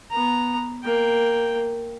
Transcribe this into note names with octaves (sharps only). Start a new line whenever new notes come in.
B3 A#5
A#3 G5